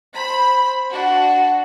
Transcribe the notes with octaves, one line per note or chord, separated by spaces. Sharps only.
C5 B5 B6
D4 F#4